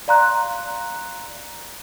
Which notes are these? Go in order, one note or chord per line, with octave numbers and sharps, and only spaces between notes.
D5 F5 A#5 C6 F#6